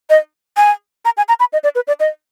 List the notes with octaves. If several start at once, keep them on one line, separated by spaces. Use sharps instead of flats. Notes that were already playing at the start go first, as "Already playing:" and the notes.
D#5
G#5
A#5
G#5
A#5
B5
D#5
D5
B4
D5
D#5